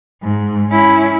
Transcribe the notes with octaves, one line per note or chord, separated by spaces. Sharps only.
G#2
C#4 E4